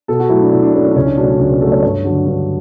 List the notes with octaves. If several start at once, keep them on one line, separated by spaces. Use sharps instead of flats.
B2 A4
F#4
F#3 A3 E4
D4
B2 E4
D4
F#3 A3 C#4
C#4
D4
C#2 C#4
D4
B2 F#3 A3 D4
D4
C#2 D4
C#4
B2 F#3 A3 A4
C#5
G2 C#5
D3 F#3
G2